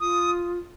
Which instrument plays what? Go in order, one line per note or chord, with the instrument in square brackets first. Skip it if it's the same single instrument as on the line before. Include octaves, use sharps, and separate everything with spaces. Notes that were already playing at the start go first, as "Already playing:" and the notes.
[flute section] F4 D#6